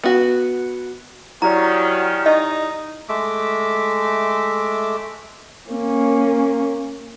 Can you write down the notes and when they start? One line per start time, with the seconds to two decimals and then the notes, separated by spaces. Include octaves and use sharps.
0.04 B3 F#4
1.42 D#3 F#3 C#4 E4 G4 D5 A#5
2.26 D#4 D#5
3.09 G#3 A3 E5 D6
5.70 A#3 C#4